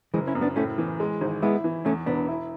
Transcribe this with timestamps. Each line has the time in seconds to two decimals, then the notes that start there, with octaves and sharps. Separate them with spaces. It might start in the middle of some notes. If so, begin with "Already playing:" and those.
0.14 F#1 E3 G#3
0.27 C#4 E4
0.35 F#2
0.41 B3 D4
0.56 A2 A3 C#4
0.78 E3
1.00 G#3
1.21 G#1
1.42 G#3 B3 E4
1.64 E3
1.85 E2 A3 C#4
2.06 E1 B3 D4
2.28 E4